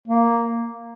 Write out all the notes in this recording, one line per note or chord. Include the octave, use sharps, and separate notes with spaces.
A#3